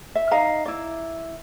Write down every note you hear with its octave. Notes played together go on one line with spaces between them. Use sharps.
E5
D#4 D#5 F5 A#5
E4 D5